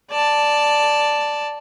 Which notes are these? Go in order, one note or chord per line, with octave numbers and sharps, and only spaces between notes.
D5 A5